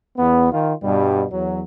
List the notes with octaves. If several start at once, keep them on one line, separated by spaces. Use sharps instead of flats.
E2 B3
D#3 F4
G2 B2 G3
E2 F#3